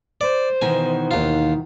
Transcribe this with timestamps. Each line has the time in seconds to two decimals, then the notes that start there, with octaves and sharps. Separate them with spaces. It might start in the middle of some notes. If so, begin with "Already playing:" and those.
0.21 C5 D5
0.62 B2 D#3 E3 G#5
1.11 D#2 F4